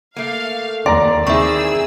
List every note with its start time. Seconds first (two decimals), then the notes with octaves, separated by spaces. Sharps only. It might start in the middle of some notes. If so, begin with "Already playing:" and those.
0.16 A3 A#3 F5
0.86 D#2 D5 A#5 C6
1.27 D#3 E3 C4 G#4 E5 C#6 E6